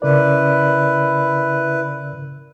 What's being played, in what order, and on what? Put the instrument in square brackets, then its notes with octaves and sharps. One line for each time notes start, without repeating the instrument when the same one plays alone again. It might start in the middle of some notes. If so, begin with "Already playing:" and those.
[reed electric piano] C#3 A#4 D5 [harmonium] E4 B4